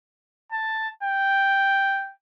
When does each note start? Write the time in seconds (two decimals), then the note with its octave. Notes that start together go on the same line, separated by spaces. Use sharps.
0.52 A5
1.03 G5